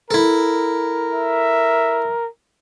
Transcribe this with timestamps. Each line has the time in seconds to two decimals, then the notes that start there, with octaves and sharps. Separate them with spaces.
0.11 E4 A4 A#4
1.14 E5